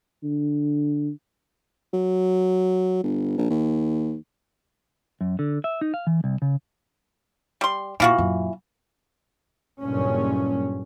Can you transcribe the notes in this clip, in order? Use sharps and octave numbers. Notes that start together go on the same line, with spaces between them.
D3
F#3
G1
A#1
D#2
F#2
D3
E5
D#4
F5
E3
C2
C#3
G3 C6
A#2 E3 F4 F#4
F#2 A#2
F#1 G2 A#2 C#4